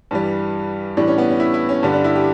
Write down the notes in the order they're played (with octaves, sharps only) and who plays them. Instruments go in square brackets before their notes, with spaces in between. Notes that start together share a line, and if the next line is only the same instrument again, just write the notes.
[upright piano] G2 E3 G3
A2 E3 G3 D4
C#4
B3
C#4
E4
E4
C#4
G2 D3 G3
D4
E4
G4